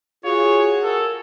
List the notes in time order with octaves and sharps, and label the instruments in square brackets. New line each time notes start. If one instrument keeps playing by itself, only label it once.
[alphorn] F4 [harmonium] F#4 G#4 [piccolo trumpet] C#5
[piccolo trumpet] A4 [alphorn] A#4